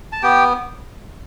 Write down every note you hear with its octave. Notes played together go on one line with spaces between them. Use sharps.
A5
B3 G4 G5